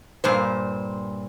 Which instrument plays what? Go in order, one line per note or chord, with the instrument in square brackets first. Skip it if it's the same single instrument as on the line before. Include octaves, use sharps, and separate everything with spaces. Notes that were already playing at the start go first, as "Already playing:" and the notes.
[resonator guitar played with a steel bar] G2 A#2 C5